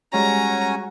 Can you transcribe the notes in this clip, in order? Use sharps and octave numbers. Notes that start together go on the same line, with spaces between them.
G3 G#3 C#4 F#4 C#5 G#5 A#5